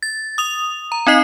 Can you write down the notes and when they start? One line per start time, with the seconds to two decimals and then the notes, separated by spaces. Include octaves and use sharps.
0.03 A6
0.38 D#6 F7
0.92 A#5
1.07 C4 D#4 D#5 C7